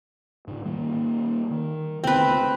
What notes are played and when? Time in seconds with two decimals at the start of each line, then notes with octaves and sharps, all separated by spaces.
0.47 G#2 C#3
0.65 D#3 G3 A#3
1.51 D#3
2.04 D2 C#3 B3 C4 B4